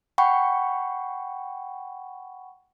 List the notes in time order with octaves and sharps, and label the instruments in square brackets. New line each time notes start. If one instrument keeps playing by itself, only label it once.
[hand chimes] F#5 G5 B5 C#6